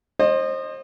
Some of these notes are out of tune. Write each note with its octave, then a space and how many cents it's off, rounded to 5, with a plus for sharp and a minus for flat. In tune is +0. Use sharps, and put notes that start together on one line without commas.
C5 +30 D#5 -25